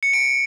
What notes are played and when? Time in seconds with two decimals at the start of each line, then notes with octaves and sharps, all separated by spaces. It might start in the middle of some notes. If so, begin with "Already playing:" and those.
0.03 C#7
0.13 D7